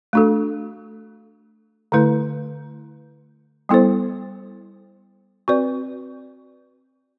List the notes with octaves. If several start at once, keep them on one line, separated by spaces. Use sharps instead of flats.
A3 D4 F#4 A4
D3 A3 E4 B4
G3 B3 E4 A4 C5
C4 F#4 B4 D5